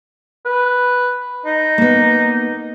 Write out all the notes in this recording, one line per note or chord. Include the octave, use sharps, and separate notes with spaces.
B4
D#4
A#3 B3